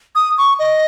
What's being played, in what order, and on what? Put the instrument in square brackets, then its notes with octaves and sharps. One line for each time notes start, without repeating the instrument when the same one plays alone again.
[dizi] D#6
C#6
D#5